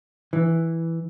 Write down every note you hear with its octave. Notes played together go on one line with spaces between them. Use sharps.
E3